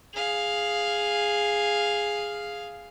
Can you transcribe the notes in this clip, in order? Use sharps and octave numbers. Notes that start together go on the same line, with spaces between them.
G#4 F5